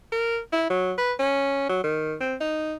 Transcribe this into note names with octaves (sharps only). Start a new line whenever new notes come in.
A#4
E4
F#3
B4
C#4
F#3
D#3
C4
D#4